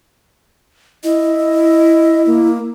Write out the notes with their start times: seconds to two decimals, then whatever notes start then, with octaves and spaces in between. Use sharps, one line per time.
1.04 E4 D#5
2.26 A#3